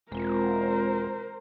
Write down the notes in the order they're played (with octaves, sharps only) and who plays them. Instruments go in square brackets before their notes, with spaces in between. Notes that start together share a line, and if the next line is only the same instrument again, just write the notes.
[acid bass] E1 [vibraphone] G#3 C4 F4 [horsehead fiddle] A#4 C5